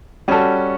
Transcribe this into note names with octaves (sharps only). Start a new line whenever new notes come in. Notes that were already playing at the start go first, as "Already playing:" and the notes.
G3 C#4 F#4 A4